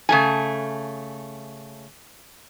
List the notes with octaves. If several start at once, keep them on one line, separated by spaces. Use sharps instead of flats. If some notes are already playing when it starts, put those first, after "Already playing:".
C#3 A3 G#5